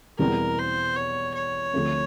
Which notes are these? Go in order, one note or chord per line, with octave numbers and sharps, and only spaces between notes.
E2 B2 G3 C4 E4 A#4
C5
C#5
C#5
D2 D3 F3 A3 C4